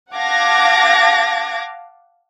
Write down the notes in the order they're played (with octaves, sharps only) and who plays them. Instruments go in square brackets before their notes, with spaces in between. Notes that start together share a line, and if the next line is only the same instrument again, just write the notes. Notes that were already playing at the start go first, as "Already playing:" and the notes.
[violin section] F5 F#5 A5 D6 G#6 A#6